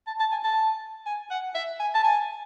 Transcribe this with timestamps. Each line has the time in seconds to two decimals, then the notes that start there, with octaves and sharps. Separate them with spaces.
0.07 A5
0.20 A5
0.32 G#5
0.44 A5
1.06 G#5
1.31 F#5
1.55 E5
1.80 G#5
1.94 A5
2.04 G#5